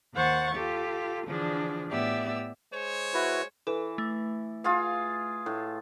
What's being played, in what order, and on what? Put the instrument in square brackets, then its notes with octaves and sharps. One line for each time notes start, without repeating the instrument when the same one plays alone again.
[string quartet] D#2 D#3 C5 F#5 C#6 A6
F4 G4 A4
D3 E3 F3 D4 G#4
A2 B3 G4 D5 E5 E6
[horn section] G#3 C5 C#5
[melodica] E4 F#4 B4
[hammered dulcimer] E3 [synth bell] A4
[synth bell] A3
[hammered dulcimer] F4 G#4 F5
A2